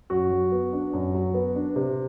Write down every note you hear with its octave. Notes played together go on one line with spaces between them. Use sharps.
F#2 F#4
F#3
B3
D4
F#2
F#3
B3
D4
C3